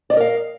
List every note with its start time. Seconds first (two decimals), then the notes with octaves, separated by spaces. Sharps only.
0.10 D5
0.13 D#5
0.17 A#4
0.20 F5